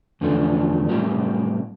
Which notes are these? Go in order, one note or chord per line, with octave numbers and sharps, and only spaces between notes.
E2 D3 F3 A3 D4
A2 G3 C4 G4 A#4